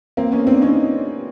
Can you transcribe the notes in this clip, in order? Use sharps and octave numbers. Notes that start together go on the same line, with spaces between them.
A#3 C4
B3 C#4
C4 D4
C#4 D#4